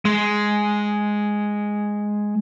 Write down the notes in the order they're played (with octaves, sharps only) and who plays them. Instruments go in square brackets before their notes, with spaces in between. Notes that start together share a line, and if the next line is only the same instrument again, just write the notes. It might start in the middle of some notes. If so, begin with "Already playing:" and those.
[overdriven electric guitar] G#3